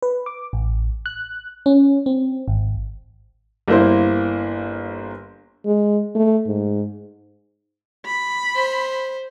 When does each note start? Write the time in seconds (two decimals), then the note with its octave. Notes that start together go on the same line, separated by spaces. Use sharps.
0.02 B4
0.26 D6
0.53 A1
1.06 F#6
1.66 C#4
2.06 C4
2.48 G#1
3.68 G1 A#3 E4 C5
5.66 G#3
6.16 A3
6.47 G#2
8.06 B5
8.55 C5